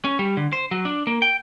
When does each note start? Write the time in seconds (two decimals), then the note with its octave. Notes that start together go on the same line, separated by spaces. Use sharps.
0.05 C#4
0.19 G3
0.37 D3
0.53 C5
0.71 F#3
0.85 D4
1.07 A#3
1.22 G5